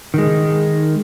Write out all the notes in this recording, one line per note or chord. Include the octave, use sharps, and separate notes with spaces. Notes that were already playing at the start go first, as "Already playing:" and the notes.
D#3 G#3